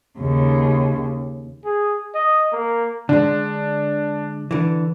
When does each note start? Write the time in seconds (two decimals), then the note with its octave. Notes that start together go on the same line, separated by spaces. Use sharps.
0.18 D#2 C#3
1.65 G#4
2.14 D#5
2.52 A#3
3.09 D3 G#3 D4
4.51 D3 E3